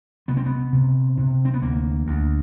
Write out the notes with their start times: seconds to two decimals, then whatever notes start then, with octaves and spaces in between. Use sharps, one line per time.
0.28 C3 B3
0.37 C4
0.46 B3
0.73 C3
1.17 C3
1.45 C4
1.54 B3
1.62 D2 A#3
2.07 D2